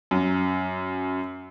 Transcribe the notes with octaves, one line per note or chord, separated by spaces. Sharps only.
F#2